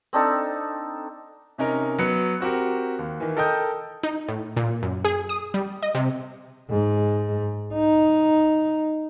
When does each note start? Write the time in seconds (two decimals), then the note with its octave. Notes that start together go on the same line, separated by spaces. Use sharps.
0.13 C4 D4 D#4 A4
1.58 C3 C#4 D#4 A#4
1.98 F#3 B3 C#7
2.41 C4 F#4 G4 A#4
2.99 D#2
3.20 D#3 E3
3.37 A4 A#4 D#5 G5 D#6 G6
4.03 D#4
4.28 A2
4.57 A#2
4.83 F#2
5.05 G#4
5.29 D#6
5.54 G3
5.83 D#5
5.95 C3
6.70 G#2
7.73 D#4